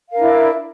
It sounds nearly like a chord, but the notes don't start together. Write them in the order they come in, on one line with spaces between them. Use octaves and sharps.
F5 A#4 D4 E4